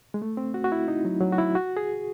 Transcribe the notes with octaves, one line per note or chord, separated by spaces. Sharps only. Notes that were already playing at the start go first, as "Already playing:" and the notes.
G#3
A3
C4
F#4
F#4
E4
D#4
F#3
F#3
F#4
E4
F#4
G#4